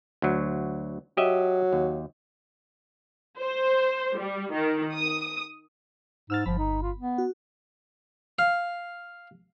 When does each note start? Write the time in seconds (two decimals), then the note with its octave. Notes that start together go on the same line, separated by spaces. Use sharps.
0.22 D2 F#3
1.17 F#3 G4 D#5 E5
1.73 D#2
3.38 C5
4.17 G3
4.51 D#3
4.95 D#6
6.30 G#2 E6 F6 A6
6.46 G1 F3 B5
6.58 D#4
6.82 F4
6.97 B3
7.18 F#4
8.39 F5